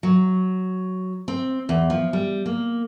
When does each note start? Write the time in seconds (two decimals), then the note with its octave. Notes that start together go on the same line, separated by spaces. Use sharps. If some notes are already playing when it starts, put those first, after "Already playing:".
0.03 F#3
1.28 C4
1.69 E2
1.90 F3
2.13 G3
2.46 A#3